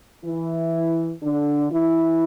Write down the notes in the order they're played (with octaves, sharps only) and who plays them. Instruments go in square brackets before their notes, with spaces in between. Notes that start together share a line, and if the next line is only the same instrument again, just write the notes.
[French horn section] E3 E4
D3 D4
E3 E4